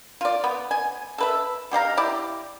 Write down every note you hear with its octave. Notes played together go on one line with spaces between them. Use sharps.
F4 D5
B3
G#5
A4 B4 E5
B2 G4 F5 A#5
E4 G4 D5